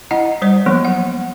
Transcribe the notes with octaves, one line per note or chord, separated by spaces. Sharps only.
E4 D#5 F#5 A#5
G3 C5 D5
F3 F#3 A#3 B3
F#5